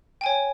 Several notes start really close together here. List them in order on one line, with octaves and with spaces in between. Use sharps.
G5 G#5 C#5